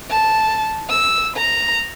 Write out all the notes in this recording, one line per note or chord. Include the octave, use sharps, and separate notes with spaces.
A5
E6
A#5